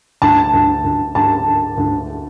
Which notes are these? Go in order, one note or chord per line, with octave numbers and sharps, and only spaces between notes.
D2 A5
D2
D2
D2 A5
D3
D2